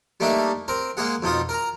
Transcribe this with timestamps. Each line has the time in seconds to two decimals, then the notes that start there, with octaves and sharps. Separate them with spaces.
0.20 G3 A3 A#3 D4 D#4 E5
0.68 C4 A#4
0.97 G#3 A#3 G#4 F#5
1.22 F2 B2 D#4 F4 D#6
1.49 A#4 A#5